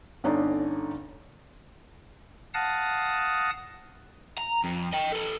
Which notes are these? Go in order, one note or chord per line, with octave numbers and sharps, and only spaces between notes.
G1 D3 C#4 D#4 D5 A#5
F5 F#5 A5 D#6 A#6
A#5
F2
D#5 G5
A4 B4